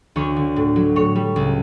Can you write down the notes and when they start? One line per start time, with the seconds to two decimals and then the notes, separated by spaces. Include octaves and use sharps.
0.16 D2 C#5
0.36 D3
0.56 A2
0.76 F#3
0.96 A2 C#5
1.16 G3
1.36 C#2